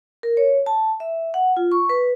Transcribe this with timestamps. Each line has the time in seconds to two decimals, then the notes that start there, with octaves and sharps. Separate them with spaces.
0.23 A#4
0.37 C#5
0.66 A5
1.00 E5
1.34 F#5
1.57 F4
1.72 C#6
1.89 B4